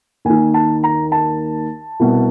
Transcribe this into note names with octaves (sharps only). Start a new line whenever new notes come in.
D#2 D#3 G#5
A5
A#5
A5
C2 B2